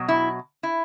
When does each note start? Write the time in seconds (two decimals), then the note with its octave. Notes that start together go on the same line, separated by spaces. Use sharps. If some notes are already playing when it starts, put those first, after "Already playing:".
Already playing: B2 F#3
0.08 E4
0.63 E4